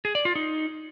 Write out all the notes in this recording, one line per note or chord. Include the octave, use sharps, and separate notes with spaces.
G#4
D5
F4
D#4